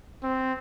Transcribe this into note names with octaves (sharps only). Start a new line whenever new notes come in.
C4